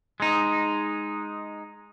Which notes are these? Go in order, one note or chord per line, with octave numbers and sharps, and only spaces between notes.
G#3 D#4